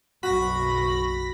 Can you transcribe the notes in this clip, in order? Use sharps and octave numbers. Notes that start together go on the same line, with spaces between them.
F#1 B1 F#4 B5 C#6 A#6